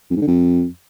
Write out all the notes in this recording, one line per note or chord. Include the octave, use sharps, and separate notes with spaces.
F2
G#2
D3
F2